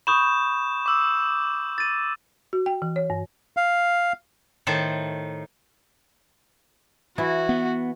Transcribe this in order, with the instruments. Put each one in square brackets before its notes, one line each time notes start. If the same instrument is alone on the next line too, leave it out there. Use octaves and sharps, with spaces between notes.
[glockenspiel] B5 C#6 D#6 [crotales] G6 E7
[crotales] D6 E6
[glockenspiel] A6 D#7
[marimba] F#4
G5
E3
C#5
G2
[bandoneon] F5
[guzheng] A2 D#3 C5 A5
[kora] E3 E4 [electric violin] F#4
[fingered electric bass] B3